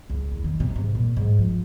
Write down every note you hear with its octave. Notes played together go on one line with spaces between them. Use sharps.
C#2
E2
D#3
C3
G#2
A#2
G#2
F3